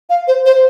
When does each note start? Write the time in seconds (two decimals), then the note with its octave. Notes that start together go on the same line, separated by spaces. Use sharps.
0.10 F5
0.28 C5
0.46 C5